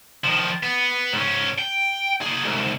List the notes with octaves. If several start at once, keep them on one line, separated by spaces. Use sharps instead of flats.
D#3 F3
B3
G#2 C#4
G5
A#3 G#4
C2 G#2